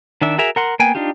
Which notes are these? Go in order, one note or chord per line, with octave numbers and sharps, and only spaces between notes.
D#3 D4 E5
F#4 G#4 A#4 E5 A#5
A#4 F#5 C6
A#3 B3 G5 G#5
D4 D#4 F4 G4